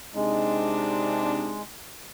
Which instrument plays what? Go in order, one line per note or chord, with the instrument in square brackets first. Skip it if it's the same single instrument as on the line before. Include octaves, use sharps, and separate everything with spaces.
[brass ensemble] C3 D4 D#4 [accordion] G#3